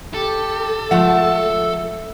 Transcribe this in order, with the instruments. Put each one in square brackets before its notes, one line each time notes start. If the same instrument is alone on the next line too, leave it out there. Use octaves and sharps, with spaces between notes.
[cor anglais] G4 [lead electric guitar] A4
[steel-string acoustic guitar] F3 G#3 [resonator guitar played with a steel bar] A3 F#5 [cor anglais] E5